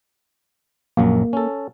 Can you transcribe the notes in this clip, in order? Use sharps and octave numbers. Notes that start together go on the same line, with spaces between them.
A#1 F#2 F#3 A#3
C#4 A4